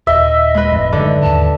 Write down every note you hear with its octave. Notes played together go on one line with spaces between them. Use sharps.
D#1 D#5 E5
G#3 B4
F#1 F2 A2
F#2 D3 D#3 D#5
D#2 G#2 A5